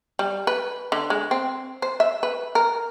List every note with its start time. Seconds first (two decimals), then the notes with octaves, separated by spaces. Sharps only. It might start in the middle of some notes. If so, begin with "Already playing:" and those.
0.19 G3
0.47 B4
0.92 D3
1.10 G#3
1.31 C4
1.82 C5
2.00 E5
2.23 B4
2.55 A#4